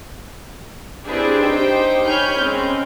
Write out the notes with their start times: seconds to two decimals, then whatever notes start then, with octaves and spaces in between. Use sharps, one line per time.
1.05 C4 D4 E4 G4 G#4 B4
1.40 D#4 G4 C5 G5
2.06 C#5 G#5 B5 F6 G6
2.36 G#3 C4 C#4